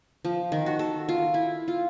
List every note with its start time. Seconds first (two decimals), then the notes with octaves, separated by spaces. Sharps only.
0.25 F3
0.52 D#3
0.66 F#4
0.79 A4
1.09 F4
1.34 E4
1.68 F4